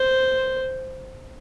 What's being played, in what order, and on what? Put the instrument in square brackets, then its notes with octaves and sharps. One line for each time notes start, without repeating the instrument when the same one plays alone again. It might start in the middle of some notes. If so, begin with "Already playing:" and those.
Already playing: [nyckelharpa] C5